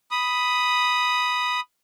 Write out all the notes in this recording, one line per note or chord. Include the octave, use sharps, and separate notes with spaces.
B5 D#6